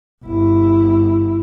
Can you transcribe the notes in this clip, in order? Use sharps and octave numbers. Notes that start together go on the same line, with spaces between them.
G1 E4